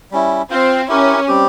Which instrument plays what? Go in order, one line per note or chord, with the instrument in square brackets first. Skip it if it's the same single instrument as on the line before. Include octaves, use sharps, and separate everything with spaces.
[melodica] G3 C#4 E4
[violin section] C4 [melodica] F4 C5 F5
[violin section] C#4 [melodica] E4 G4 A#4
[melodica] G3 C4 G4